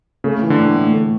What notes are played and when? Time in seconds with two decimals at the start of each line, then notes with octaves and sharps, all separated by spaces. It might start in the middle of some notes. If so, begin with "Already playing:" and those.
0.24 C#3 A3
0.42 E3
0.50 D3
0.59 A2
0.76 A2
0.93 A3